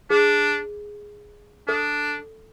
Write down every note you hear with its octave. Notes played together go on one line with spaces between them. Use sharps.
D4 G#4
D4 A4